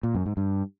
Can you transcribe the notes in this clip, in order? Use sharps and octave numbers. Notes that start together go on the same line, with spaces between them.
A#2
F#2
G#2
G2